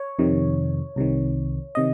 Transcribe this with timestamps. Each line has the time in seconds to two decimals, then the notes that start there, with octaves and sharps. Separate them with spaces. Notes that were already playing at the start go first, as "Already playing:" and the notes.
Already playing: C#5
0.19 F2 C3 D#3
0.96 C2 C3 D#3
1.75 C3 D#3 D#5